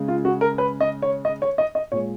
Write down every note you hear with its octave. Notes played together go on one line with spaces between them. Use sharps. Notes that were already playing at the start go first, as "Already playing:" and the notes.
Already playing: C#3 G#3
F4
F#4
A#4
B4
D#5
C#5
D#5
C#5
D#5
D#5
A#2 G#3 C#5